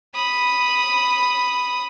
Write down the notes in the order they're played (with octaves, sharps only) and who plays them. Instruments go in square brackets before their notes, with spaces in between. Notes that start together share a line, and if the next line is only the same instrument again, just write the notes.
[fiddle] B5 D#6